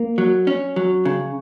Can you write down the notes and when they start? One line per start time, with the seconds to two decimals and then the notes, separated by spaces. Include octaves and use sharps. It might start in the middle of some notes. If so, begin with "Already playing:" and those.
Already playing: A#3
0.18 F#3
0.47 C#4
0.76 F#3
1.05 C#3